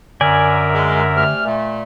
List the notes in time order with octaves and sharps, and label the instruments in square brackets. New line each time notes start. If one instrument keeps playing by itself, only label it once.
[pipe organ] F#2 A#4 E5 [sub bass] D3 [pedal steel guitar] D5 G#5
[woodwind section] G#3
C3 A3 F6
A#2 A3